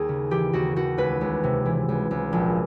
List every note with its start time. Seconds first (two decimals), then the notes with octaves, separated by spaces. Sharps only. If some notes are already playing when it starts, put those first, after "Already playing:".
Already playing: D#2 G#4
0.09 C#3
0.31 E3 G4
0.53 D#2 F#4
0.76 D#2 F#4
0.98 C#2 B4
1.21 C#2
1.44 C3
1.65 E3
1.89 C#2
2.11 C#2
2.33 A#1